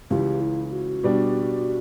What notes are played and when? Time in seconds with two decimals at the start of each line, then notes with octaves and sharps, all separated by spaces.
0.10 C#2 C#3 E3 G4
0.41 E4
0.72 F#4
1.03 B2 G3 D4